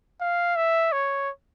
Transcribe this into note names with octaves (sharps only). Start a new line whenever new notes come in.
F5
E5
C#5